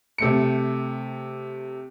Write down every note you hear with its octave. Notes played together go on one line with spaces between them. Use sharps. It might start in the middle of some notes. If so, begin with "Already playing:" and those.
C3 A3 C#7